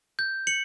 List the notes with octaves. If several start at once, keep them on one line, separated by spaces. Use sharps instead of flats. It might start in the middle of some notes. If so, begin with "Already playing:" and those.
G6
C#7 F#7